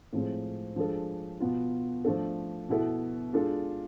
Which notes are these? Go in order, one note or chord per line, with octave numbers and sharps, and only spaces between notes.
A2 F3 G#3 C4
F3 G#3 D4 A4
B2 B3 F4
F3 A3 D4 A4
B2 B3 E4 A4
G#3 D4 F4 A4